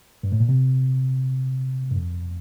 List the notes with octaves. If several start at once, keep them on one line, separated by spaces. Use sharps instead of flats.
G2
A2
A#2
C3
G2
F2